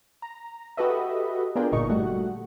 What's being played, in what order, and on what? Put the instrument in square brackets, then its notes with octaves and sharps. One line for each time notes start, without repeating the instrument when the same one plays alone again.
[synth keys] A#5
F#4 G4 A4 B4 D#5 E5
B3 D4 F4 G#4 A#4 G5
G1 A#2 D#4 C#6
G3 A3 F#4 F#5